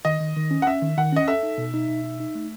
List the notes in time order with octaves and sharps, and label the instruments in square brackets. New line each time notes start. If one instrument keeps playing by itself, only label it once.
[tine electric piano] D#3 [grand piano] D#5
[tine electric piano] D#3
D#3
C#4
[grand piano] F#5
[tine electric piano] C#4 [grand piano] E5
[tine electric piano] D#3
[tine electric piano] D#3 [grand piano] F#5
[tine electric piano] C#4 [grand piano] D#5
[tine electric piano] A4 [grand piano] E5
[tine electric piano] D#4
B2
D#4
B2
D#4
D#4
A3